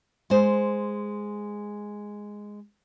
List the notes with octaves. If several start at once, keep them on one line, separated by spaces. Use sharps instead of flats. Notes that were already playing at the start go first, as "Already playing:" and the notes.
G#3 C5